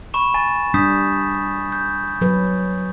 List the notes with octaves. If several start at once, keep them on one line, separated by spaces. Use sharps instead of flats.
B5 C#6 E7
G#5 A6
G3 D4 D#6 G6 B6
G6
F#3 B4